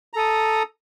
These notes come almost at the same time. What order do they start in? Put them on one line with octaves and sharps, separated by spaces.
A#5 A4 D#6